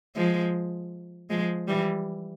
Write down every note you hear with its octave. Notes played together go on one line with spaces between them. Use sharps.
F3 G#3
F3 G#3
E3 G3